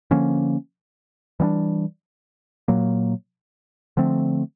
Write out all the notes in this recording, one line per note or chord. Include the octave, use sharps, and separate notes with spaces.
D3 F3 A#3 C#4
E3 G3 B3 D4
A#2 F#3 A#3
D3 F3 A3 C4